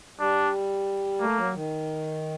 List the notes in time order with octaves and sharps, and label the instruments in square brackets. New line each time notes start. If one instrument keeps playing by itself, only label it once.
[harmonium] G3 [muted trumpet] D4
[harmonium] A3 [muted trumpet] A#3
[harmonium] F#3
D#3